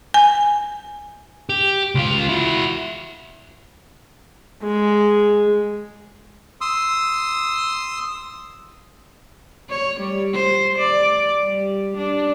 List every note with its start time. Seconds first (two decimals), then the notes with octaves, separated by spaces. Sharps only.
0.14 G#5
1.49 G4
1.95 C#2 F4
2.29 E4 F#4
4.63 G#3
6.61 C6 D#6 E6
9.69 C#5
10.00 G3
10.33 C5
10.78 D5
11.43 G3
11.98 D4